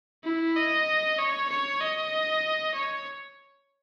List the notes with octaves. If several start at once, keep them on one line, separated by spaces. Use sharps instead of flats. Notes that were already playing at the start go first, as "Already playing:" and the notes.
E4
D#5
C#5
C#5
D#5
C#5